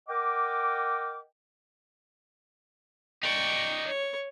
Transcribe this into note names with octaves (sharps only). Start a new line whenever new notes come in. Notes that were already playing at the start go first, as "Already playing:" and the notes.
A#4 D#5 F#5 G5 D6
D#4 D5 G5 C#6
C#5